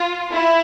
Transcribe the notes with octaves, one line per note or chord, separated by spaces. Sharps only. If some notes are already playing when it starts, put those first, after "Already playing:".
Already playing: F4
E4